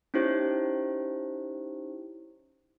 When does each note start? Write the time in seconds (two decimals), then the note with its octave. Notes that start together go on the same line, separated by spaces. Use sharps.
0.14 C#4 D#4 E4 G4 C5